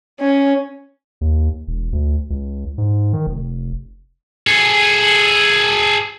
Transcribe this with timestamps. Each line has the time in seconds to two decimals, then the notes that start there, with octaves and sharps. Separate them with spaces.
0.20 C#4
1.21 D#2
1.67 E1
1.93 D2
2.30 C#2
2.78 G#2
3.13 D#3
3.27 F1
4.47 G#4 A4